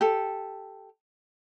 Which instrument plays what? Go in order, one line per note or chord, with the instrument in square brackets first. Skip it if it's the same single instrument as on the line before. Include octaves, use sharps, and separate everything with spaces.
[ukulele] G4 A4